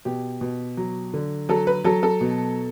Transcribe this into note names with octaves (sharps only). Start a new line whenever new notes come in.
B2 G4
B2
F#3
D3
F#3 A4
B4
F#3 A4
A4
B2